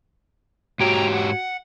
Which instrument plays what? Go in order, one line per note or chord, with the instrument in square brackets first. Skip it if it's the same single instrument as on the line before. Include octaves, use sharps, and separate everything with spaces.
[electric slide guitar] G#2 G4 C#5 [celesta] F#4 G#6 D7 [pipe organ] G5 A#5
[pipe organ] F#5